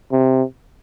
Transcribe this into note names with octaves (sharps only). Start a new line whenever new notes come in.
C3